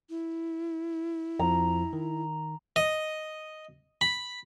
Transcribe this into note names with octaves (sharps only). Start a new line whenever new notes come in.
E4
F2 F3 A#5
D#3
D#5
B5